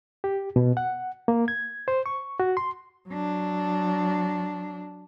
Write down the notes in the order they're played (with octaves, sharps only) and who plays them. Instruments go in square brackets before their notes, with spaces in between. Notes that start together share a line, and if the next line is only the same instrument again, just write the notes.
[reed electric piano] G4
B2
F#5
A#3
G#6
C5
C#6
F#4
C6
[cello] F#3 D4